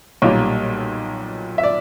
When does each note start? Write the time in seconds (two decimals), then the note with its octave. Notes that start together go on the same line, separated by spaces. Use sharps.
0.22 B1 A#2 G3 A#3 C#5
1.58 E5
1.63 D5